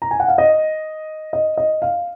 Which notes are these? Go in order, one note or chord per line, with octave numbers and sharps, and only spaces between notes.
A#5
G#5
F#5
F5
D#5
D#5
D#5
F5